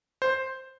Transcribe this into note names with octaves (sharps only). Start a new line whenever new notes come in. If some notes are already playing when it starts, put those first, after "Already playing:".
C5